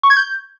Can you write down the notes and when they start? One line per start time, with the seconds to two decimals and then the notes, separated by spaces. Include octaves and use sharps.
0.03 C#6
0.10 G#6
0.17 G6